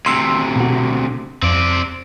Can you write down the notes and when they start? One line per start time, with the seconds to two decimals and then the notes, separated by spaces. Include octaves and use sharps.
0.06 D2 C3 C6 E6
0.56 B2 F#4
1.43 F2 C4 D5